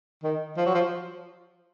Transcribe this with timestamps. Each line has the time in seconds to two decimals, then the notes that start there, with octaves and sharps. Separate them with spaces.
0.23 D#3
0.57 F3
0.66 F#3
0.74 F3